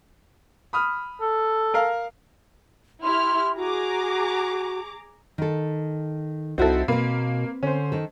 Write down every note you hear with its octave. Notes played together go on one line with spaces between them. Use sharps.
B5 D#6 F6
A4
A#4 F5
E4 G4 C6 F6
F#4 G#4 A#5 D6
D#3 A4
C2 C4 D#4 E4 F#4 A4
B2 A#3 C4 B4
D3 C#4 C5
D#3 A4